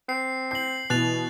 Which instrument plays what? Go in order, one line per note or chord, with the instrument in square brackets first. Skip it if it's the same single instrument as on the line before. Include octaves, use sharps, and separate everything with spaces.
[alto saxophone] C4 [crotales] C7
[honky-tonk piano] G6 A#6 [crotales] C7 F#7
[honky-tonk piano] B2 E3 [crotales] F#6 A6 F7